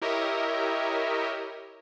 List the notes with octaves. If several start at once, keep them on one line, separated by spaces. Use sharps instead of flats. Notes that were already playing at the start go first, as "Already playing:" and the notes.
E4 G4 A#4 C#5 D#5 E5